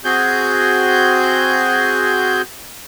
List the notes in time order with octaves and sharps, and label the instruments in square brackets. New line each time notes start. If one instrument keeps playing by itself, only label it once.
[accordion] C4 F#4 G#4 G6